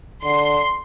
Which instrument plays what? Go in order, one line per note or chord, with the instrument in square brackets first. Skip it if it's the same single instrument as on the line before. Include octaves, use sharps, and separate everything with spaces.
[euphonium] D3 [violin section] C6